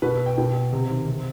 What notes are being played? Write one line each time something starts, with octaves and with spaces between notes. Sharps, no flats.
B2 B4
G5
B2 G5
C3
D#3
C3